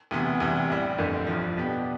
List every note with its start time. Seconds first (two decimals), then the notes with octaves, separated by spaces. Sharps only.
0.11 D2 C3 E3 B3
0.40 D2 C3 E3 G3
0.70 A1 A2 G3
0.98 G1 F2 D3 A3
1.27 A1 G2 F3
1.56 B2 B3 D4 G4